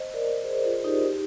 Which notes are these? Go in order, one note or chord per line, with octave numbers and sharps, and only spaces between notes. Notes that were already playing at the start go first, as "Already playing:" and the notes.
Already playing: C5 D#5
A#4 D5
G#4 C5
F4 G#4
D#4 G4
D#4 G4